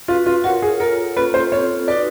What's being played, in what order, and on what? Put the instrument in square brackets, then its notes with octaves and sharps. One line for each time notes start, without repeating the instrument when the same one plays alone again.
[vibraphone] C#4 F#4 B4 [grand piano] F4
[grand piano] F4
[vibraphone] F4 A#4 C#5 [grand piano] F#4
[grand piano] G#4
[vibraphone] F4 A4 C#5 [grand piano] A#4
[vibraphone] A#3 C#4 F4 A4 [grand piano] B4
[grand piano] C5
[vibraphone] C4 F4 A4 [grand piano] C#5
[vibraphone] D#4 F#4 B4 [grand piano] D5